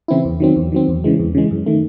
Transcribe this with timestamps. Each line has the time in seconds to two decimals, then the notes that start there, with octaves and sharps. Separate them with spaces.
0.08 C#3 E3 C4 E4
0.25 E2
0.40 D#3 F#3 C4
0.56 E2
0.72 D#3 F#3 C4
0.88 E2
1.04 C#3 E3 G#3
1.19 E2
1.35 C#3 E3 G#3
1.51 F#2
1.66 D#3 A3